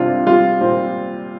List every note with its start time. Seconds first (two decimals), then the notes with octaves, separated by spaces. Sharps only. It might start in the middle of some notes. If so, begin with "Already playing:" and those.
Already playing: C3 G3 D4 F4
0.27 G3 F4
0.61 A#2 C4